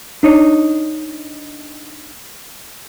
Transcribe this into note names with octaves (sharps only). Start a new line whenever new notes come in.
D4 D#4 C#5